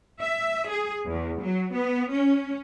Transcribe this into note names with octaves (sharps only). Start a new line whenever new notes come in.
E5
G#4
E2
F#3
B3
C#4